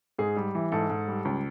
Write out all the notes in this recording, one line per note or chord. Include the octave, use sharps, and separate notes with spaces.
G#2 G#4
G3
E3
G#2 A4
G#2
G3
C#2